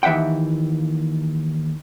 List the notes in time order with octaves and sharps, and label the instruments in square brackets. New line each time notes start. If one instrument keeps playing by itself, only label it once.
[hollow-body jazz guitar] D#2 E3 E5 F#5 G5